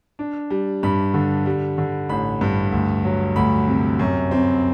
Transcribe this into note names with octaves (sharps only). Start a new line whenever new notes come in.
D4
G3
G2 B5
D3
G3
D3
A1 B5
G2
D2
F#3
D2 B5
C3
F#2
C4